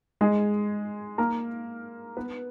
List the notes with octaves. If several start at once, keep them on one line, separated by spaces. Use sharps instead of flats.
G#3 G#4
A#3 A#4
B3 B4